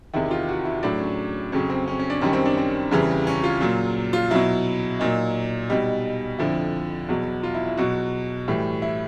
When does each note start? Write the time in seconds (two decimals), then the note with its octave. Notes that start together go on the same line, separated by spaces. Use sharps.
0.14 E2 C3 D#3 E4
0.31 F4
0.48 F#4
0.65 E4
0.83 A2 F#3 D4
1.00 C#4
1.52 F2 C#3 F#3 C#4
1.70 C4
1.88 C#4
1.99 C#4
2.10 D4
2.21 F#2 D#3 G3 C#4
2.33 C4
2.46 D4
2.57 C4
2.91 E2 C#3 E3 G3
3.27 C#4
3.44 F4
3.61 A#2 F#3
4.13 F4
4.31 B2 F#3 E4
4.99 A#2 F#3 D#4
5.70 B2 G3 D#4
6.38 F2 D3 F3 E4
7.09 E2 B2 F#3
7.43 F4
7.54 E4
7.66 E4
7.77 B2 F#3 F#4
8.48 A2 E3 G3
8.82 E4